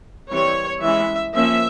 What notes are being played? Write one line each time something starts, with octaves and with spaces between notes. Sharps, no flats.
E3 G3 C4 C#5
E3 G#3 C#4 E5
F3 A#3 C#4 E5